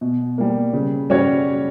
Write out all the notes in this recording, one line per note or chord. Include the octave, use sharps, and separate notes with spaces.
B2
G3 A#3
C#3
G3 C#4 F#4 C#5